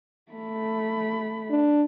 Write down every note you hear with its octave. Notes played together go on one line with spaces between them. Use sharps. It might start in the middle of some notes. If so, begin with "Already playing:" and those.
A3 B5
D4